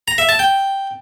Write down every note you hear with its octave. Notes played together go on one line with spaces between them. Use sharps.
A#5
E5
A5
G5